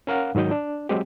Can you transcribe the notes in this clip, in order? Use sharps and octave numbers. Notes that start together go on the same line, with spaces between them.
C#4 A#4 F5 F#5
G#2 D#3 F#3 D#5 G6
D4
F#3 G#3 C4 G4